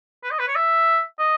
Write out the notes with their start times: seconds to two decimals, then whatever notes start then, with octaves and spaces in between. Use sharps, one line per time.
0.24 B4
0.31 D#5
0.39 B4
0.48 C#5
0.56 E5
1.19 D#5